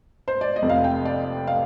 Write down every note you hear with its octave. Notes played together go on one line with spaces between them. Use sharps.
C5
D5
D#5
F1 F2 C3
F5
G5
D5
F5